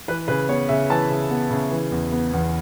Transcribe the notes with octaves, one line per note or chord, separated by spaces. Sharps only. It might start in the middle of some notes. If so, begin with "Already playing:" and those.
E3 B4
C#3 B4
B3 C#5
C#3 E5
E3 A5
C#3
B3
C#3
E3
E2
B3
E2